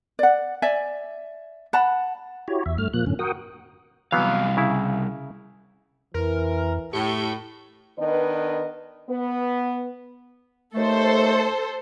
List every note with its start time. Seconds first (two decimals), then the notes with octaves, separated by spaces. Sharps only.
0.19 D5 F#5
0.62 D5 E5 G#5
1.73 F#5 A5 B5
2.48 E4 F#4 G4 C#5
2.66 E2 E5
2.78 G2 A3 F6
2.94 A#2 F3 A#3 F#6
3.06 F#2 A2 D3 C#4
3.19 F#4 A#4 F#5 G5 D#6
4.12 C2 E3 F#3 B3 F5
4.57 C#3 E4
6.14 F2 E3 A#4
6.93 A2 G4 C#6
7.99 D#3 B3 D4 B4 D#5
9.09 B3
10.75 D#2 A3 A4 C5